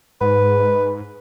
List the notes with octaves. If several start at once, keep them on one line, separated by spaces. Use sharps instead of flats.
G#2 B4